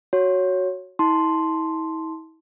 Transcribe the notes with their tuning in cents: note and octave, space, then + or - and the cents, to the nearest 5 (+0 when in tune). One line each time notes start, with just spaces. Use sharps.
F#4 +0 C#5 +0
E4 -40 A5 +0 C6 +0